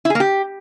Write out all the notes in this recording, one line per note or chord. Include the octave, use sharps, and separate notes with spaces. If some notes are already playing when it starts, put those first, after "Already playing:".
E4
G#4
A#3
G4